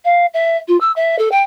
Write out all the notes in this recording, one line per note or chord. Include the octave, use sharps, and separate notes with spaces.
F5
E5
F4
E6
E5
A4
G5